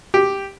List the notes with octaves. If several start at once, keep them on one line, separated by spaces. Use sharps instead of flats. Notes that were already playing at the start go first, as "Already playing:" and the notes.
G4